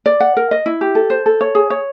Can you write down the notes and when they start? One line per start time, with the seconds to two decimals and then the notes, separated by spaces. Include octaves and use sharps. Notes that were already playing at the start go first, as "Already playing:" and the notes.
0.06 D5
0.20 F#5
0.37 A#4
0.51 D#5
0.66 E4
0.81 G4
0.95 A4
1.10 C5
1.26 A4
1.41 C#5
1.55 G#4
1.70 C#5